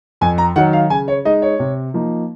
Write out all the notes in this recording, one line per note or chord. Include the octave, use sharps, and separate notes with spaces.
F2 G#5
A#5
D#3 F#3 F#5
F5
C#3 G#5
C#5
G#3 D#4 D#5
C#5
C3
F3 A#3 D#4